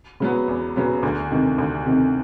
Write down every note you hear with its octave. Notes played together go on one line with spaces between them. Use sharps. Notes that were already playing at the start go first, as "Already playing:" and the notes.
C#3 F#3 B3
E2
C#3 F#3 B3
D2
C3 D#3
D2
C3 D#3